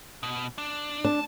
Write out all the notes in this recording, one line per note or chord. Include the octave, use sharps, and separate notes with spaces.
B2
D4
D4 A5